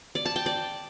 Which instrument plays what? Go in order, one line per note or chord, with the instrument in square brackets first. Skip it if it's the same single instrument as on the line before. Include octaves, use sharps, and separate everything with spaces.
[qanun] D5
A5
G5
D5